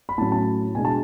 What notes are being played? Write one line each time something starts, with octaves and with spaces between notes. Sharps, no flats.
B5
A2 F#3 C#4 A5
A5
B2 G#3 D4 G#5
A5